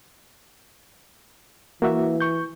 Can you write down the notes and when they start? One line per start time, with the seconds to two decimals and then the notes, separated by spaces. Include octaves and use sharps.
1.82 E3 A#3 F#4 E5
2.21 C#6 G6